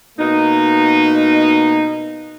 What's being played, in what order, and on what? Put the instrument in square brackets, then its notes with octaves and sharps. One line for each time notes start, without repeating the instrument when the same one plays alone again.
[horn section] B2 A#3 D#4